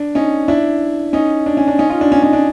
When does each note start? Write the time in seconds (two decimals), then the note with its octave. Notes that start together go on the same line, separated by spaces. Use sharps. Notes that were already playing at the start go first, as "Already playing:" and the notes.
Already playing: D4
0.15 C#4 D#4
0.48 D4 E4
1.13 C#4 D#4
1.46 D4
1.57 C#4
1.68 D4
1.78 C#4 D#4
1.90 D#4 F4
2.01 D4
2.12 C#4 D#4
2.22 C#4 D#4
2.33 D4